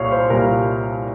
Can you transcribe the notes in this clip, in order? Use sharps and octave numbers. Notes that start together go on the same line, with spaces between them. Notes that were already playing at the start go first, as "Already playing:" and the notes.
Already playing: C2 A#2 G3 C#5 F5
C5
C2 A#2 G3 A#4